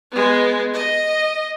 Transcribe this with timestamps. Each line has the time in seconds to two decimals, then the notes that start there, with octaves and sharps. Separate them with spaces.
0.11 G#3 B3
0.74 D#5